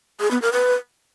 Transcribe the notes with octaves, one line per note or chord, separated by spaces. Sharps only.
G#4
B3
A#4
B4